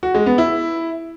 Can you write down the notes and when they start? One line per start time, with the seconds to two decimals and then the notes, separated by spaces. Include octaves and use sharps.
0.03 F#4
0.15 G#3
0.26 B3
0.38 E4